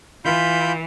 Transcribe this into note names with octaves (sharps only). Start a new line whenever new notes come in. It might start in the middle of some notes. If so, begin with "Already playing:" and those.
E3 F4 B5 G6